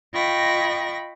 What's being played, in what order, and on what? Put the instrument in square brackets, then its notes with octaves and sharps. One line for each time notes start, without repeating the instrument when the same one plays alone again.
[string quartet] F4 D#5 G5 B5 C#6 A#6